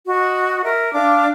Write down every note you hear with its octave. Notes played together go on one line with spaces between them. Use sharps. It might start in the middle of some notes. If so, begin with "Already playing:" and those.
F#4 D#5
A#4 E5
D4 F5 D6